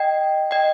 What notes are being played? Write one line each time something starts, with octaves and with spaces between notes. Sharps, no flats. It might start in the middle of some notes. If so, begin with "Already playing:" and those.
Already playing: D#5 G5
D#5 G5